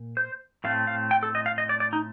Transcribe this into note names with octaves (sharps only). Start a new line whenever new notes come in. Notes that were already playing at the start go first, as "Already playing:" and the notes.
Already playing: A#2
C5
A2 A3 C4 F5
F5
G5
A4
D#5
F5
D#5
D5
D5
D#4